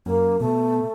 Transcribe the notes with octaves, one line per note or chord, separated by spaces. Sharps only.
F#2 A#3
B2 A3